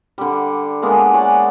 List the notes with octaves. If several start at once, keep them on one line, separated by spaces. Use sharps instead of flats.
D3 G3
G#3 A#3 B3 D4
C#5 D5 F#5 G#5